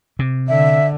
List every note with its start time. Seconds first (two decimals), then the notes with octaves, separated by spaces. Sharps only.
0.19 C3
0.49 D3 E5